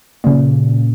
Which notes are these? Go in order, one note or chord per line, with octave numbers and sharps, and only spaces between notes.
A#2 C#3